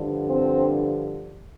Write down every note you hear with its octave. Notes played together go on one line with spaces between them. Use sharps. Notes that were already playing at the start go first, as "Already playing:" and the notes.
Already playing: G2 D3 F3
C4